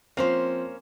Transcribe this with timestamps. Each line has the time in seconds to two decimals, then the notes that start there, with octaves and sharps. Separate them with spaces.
0.17 F3 A#3 C4 C#4 C5